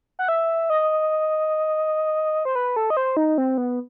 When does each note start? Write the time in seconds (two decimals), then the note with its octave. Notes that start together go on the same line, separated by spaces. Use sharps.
0.19 F#5
0.28 E5
0.70 D#5
2.45 C5
2.55 B4
2.76 A4
2.90 D#5
2.97 C5
3.17 D#4
3.38 C4
3.58 B3